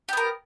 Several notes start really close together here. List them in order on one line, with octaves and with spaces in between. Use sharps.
G4 B3 A#4